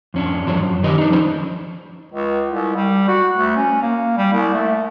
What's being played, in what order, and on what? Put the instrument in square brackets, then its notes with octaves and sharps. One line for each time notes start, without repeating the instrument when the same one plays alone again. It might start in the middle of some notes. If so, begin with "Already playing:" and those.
[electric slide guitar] F2 C#4 D4
F#2 F3 C5 C#5
F#2
D#3 G4 B4 D#5
D4 D#4
F3 C#4 C5
[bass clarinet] C#2
C2
G3
F#4
D2
C#4
A#3
G3
C2
A3